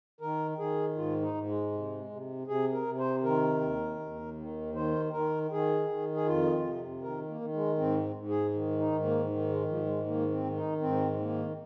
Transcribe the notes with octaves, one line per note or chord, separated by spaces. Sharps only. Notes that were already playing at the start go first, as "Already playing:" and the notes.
D#3 A#4
D#3 G#4
G#2 F4
D#4
G#2
G#3
C3
C3
C3 G#4
A#4
C3
C5
D#3 A#4
D#2
D#2
D#3
D#3 C5
D#3 A#4
D#3 G#4
D#3
G#4
F2 F4
C3
D#3 A#4
A#3
D#3
G#3
G#2 C4
G#2
G#4
D#3
D#4
G#2
A#3
D#3
G#3
G#2 F3
G#3
D#3 A#3
C4
D#3
D#4
G#2 C4
D#3 A#3